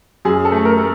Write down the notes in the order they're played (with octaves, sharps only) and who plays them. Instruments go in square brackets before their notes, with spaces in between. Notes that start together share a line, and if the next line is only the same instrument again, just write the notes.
[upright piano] F#2 G#4
A4
A3
A#4
A3